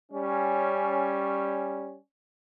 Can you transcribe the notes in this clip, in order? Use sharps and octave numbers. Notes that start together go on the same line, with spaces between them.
G3 C#4